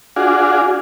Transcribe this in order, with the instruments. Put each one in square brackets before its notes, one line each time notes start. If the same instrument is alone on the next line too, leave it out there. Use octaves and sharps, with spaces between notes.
[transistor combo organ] D4 F4 F#4 G#4